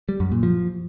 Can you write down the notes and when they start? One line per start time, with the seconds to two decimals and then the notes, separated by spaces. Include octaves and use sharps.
0.09 G3
0.20 F#2
0.32 A#2
0.43 F3